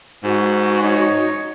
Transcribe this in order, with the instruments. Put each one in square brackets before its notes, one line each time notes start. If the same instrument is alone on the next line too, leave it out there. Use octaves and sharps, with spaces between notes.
[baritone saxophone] G#2 [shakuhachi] F#4
[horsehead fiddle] D#4 C#5